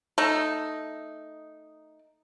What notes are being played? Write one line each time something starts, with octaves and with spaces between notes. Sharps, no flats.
A3 D#4